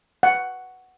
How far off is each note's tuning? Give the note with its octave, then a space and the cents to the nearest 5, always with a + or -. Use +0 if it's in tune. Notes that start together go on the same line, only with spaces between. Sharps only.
F#5 +5